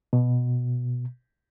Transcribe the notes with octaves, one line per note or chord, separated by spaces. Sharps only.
B2